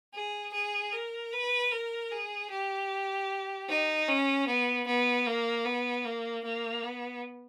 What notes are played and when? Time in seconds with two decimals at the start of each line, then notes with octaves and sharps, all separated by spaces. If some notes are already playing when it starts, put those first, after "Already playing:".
0.14 G#4
0.53 G#4
0.92 A#4
1.32 B4
1.72 A#4
2.12 G#4
2.50 G4
3.69 D#4
4.08 C#4
4.47 B3
4.87 B3
5.26 A#3
5.65 B3
6.05 A#3
6.44 A#3
6.83 B3